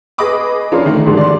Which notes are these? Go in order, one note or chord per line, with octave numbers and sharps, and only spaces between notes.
G#4 B4 D#5 B5 D6 D#6
F3 C#4 D4 F4 G#4 A#4
D3 D#3 A3
G#2 D3 F3 G3 G#3
D5 C6